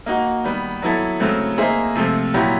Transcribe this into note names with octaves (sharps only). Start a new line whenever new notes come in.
A#3 D#4 F#4
D#3 G3 B3
F#3 B3 E4 A4
C#3 F#3 A3 C4
A#3 D#4 G#4 C5 E5
C3 F3 A3 C4
A#2 F#3 B3 E4 G4